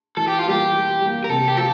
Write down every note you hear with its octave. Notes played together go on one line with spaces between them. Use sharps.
E3 A4
G4
F4
G3 A#3 G4
E3
G3 A#3
A#4
C3 A4
G4
F3 A4